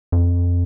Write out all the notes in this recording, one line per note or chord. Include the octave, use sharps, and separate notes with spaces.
F2